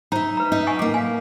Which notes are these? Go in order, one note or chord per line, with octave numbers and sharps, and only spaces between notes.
D#4 C5 E5 A#5
B4 A#5
D#4 E5
F#5 G#5 C#6
A2 A#3 D6
F5 G#5